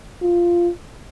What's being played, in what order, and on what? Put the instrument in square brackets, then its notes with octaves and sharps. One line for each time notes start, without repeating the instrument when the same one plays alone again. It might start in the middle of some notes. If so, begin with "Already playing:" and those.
[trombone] F4